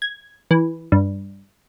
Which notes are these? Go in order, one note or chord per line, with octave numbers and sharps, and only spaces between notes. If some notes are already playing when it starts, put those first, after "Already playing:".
G#6
E3
G2